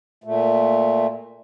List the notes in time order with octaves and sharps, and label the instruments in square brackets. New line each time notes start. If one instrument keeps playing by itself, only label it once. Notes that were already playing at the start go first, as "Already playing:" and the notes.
[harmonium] A#2 A3